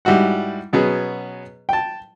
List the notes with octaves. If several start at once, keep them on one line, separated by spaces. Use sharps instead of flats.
G#2 G3 E4 F#4 F#5
B2 F#3 B3 C#4 F#4 G#4
G5 A5